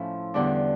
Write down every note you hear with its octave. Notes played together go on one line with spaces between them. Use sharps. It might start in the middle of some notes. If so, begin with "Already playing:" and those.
Already playing: A2 F3 C#4 E4
E2 D3 G3 D4